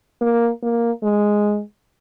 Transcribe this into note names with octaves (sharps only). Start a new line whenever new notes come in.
A#3
A#3
G#3